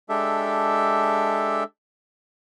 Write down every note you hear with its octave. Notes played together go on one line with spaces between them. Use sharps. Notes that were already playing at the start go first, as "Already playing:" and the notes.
G#3 D4 G4 A4 E5